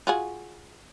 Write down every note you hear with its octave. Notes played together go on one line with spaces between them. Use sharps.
F4 F#4 G#4